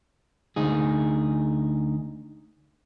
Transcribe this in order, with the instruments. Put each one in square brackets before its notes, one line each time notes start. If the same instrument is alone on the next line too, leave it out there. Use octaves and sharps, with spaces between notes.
[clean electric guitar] D2 D#4 G#4